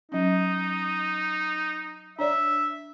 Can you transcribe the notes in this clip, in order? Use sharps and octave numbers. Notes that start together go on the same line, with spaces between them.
F#3 C#4 D#4
D4 C#5 D5 E5